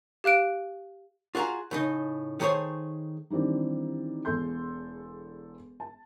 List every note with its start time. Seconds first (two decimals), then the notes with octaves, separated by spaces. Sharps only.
0.24 G4 F5 F#6 D7
1.35 F4 F#4 G#4 F5 A#5
1.71 A2 C#3 D#4
2.40 D#3 A3 G#4 C5 C#5
3.30 D#3 E3 G3 C4 D4
4.25 E1 E2 A4 C6 G6
5.80 A5